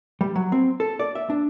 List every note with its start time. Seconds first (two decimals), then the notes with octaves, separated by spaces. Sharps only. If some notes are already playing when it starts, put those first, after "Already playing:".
0.21 G3
0.36 F#3
0.52 C4
0.80 A4
0.99 D5
1.15 E5
1.30 D4